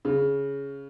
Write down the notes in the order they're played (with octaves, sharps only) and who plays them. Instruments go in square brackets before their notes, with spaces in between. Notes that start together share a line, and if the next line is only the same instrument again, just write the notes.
[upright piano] C#3